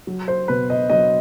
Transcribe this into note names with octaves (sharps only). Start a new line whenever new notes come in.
F#3
C5
B2 B4
D#5
F#3 D#5